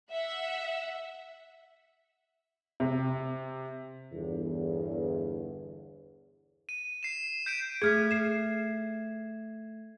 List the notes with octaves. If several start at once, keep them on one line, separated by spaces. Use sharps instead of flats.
E5 F#5
C3
G1 E2
D#7
C7 E7
G6 B6 D7 D#7
A3 G#4 F6 G#6 B6
C7 E7